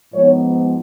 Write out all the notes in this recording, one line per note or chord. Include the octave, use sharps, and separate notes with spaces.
G#2 F3 G#3 B3 D#4 C#5